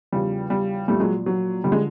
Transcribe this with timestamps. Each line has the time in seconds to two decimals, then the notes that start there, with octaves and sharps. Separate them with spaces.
0.12 E2 C#3 F3 G3
0.50 G3
0.88 A#2 F3 G3 A3
1.00 F#3 G#3
1.26 F#3
1.64 D3 F3 G3
1.72 G#3